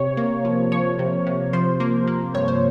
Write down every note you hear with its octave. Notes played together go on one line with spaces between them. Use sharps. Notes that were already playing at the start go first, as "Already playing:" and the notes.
Already playing: C3 C#5
A#3
F3
F3 C#5
C3
C3
F3 C5
A#3
A#3
G2 C#5
C5